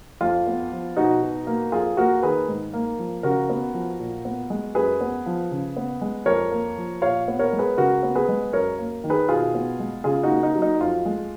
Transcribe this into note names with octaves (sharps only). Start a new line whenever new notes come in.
F2 F4
B3
F3
B2 D#4 F#4
B2
A#3
F2 F4 G#4
A#3 F#4 A#4
D#3 G#4 B4
G#2
A#3
F3
C#3 F#4 A#4
B3
F3
A#2
B3
G#3
F#2 G#4 B4
B3
F3
C#3
B3
G#3
F2 A#4 C#5
A#3
F3
A#2 C#5 F5
B3
A#4 C#5
G#3
G#4 B4
C#3 F#4 A#4
B3
G#4 B4
G#3
F#2 A#4 C#5
A#3
D#3
G#4 B4
B2 F4 G#4
B3
G#3
C#3 F4 G#4
D#4 F#4
A#3
D#4
F#3
D#4
F2 F4
G#3